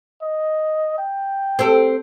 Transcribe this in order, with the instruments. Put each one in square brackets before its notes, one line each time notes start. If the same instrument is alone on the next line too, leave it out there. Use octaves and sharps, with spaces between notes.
[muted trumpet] D#5
G5
[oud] C4 G4 A4